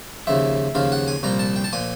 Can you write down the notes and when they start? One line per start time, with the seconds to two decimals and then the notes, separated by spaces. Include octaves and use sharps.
0.27 D#2 C#3 F3 E5
0.75 D#2 C#3 F3 F5
0.92 F#5
1.08 G#5
1.23 C2 A#2 F3 A#5
1.39 A5
1.56 G5
1.64 A5
1.73 A#2 F3 G#5